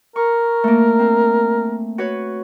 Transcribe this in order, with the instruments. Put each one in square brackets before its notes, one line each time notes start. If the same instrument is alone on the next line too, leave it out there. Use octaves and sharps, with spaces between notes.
[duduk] A#4 [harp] C#6
[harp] A3 A#3
C4
F#4 B4 C#5